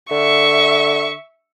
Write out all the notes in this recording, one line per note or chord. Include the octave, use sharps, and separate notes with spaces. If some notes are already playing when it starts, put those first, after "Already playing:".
D3 E5 C#6